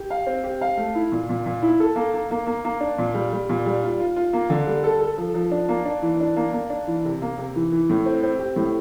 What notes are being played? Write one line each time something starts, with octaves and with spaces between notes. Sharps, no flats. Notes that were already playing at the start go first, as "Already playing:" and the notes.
Already playing: G4
F5
C4
G4
F5
A3
E4
A#2
A#2
A#2
E4
A4
A#3
A#3
A#3
A#3
A#3
D4
A#2
G3
G3
A#2
G3
F4
F4
F4
A#3
D3
G3
A4
A4
F3
F3
D4
A#3
D4
E3
D4
A#3
A#3
D4
E3
C3
A#3
C3
E3
E3
A2
C4
C4
G4
A2